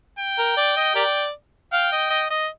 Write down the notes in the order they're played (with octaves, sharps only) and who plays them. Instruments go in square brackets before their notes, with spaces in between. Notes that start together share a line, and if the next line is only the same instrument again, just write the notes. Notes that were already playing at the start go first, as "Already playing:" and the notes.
[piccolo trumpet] G5
[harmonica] A#4
D5
D#5
G4 A#4 D5
[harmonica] F5 [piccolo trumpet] G5
[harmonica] D#5
D#5
D#5